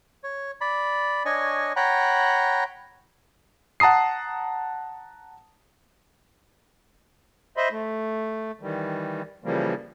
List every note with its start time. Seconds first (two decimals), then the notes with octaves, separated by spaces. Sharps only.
0.23 C#5
0.61 D5 B5
1.25 D4 C#5 D#5 G#5 C#6
1.76 C#5 F#5 G5 A#5 B5
3.80 F#5 A5 A#5 D#6 C7
7.57 C5 D#5 E5 B5 C6
7.71 A3
8.61 D#3 E3 G3
9.44 C#3 E3 F3 G3 A#3